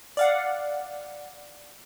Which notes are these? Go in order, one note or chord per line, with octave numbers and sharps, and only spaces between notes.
D5 F5 F#5